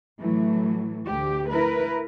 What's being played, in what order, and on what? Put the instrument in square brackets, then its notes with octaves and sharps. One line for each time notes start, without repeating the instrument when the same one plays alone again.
[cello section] A2 E3 F#3 A3
D2 G4
E4 A#4 B4